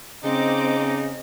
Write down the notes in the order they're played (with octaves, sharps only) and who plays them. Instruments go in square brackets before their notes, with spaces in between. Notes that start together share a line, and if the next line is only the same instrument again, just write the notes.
[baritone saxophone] C#3 [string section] C4 D6 [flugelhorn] D#4 [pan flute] D#5